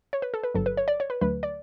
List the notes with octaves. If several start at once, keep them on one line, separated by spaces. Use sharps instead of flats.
C#5
B4
A4
B4
G1 G2 F#3 A4
B4
C#5
D5
C#5
B4
D2 D3 F#3 A3 B4
D5